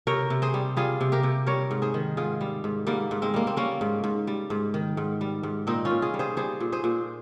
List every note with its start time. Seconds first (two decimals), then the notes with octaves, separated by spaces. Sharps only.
0.07 C3 A#4 C#5
0.30 C3
0.42 G#4 C5
0.54 G3
0.77 G3 F4 G#4
1.01 C3
1.12 G4 A#4
1.23 C3
1.47 G3 A#4 C#5
1.71 G#2
1.82 G#4 C5
1.94 D#3
2.17 G#2 F4 G#4
2.41 G3
2.64 G#2
2.87 G#2 G3 A#3
3.11 G#2
3.22 G#3 C4
3.34 G3 A#3
3.47 C4
3.57 G3 A#3 C#4
3.81 G#2
4.04 G#2
4.27 G3
4.50 G#2
4.74 D#3
4.97 G#2
5.21 G3
5.43 G#2
5.67 A#2 C4 D#4
5.85 C#4 F4
5.90 A#2
6.02 F4 G#4
6.14 G3
6.19 G#4 C5
6.37 G3 G#4 C5
6.60 A#2
6.72 G#4 C5
6.84 A#2